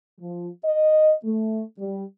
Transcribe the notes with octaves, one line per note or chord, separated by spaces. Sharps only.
F3
D#5
A3
G3